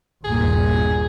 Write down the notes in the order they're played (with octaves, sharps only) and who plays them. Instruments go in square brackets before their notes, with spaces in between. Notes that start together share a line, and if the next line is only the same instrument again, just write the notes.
[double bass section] G1 D#2 A#2 [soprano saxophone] G#4